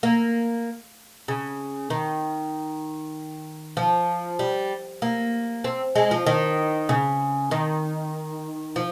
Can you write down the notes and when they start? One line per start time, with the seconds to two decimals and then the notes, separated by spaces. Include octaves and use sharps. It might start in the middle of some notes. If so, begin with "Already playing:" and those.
0.03 A#3
1.28 C#3
1.90 D#3
3.77 F3
4.39 G3
5.02 A#3
5.64 C4
5.95 G#3
6.11 F3
6.26 D#3
6.89 C#3
7.51 D#3
8.76 F3